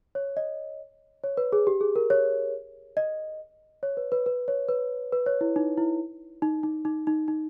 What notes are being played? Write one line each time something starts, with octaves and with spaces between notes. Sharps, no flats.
C#5
D#5
C#5
B4
G#4
G4
G#4
A#4
C#5
D#5
C#5
B4
B4
B4
C#5
B4
B4
C#5
E4
D#4
E4
D#4
D#4
D#4
D#4
D#4